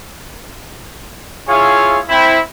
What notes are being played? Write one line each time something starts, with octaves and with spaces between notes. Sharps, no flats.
E4 F4 G#4 C#5 E5 F5
C4 E4